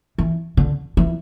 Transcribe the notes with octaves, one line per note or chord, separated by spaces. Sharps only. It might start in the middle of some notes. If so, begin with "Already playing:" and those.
E3
D3
E3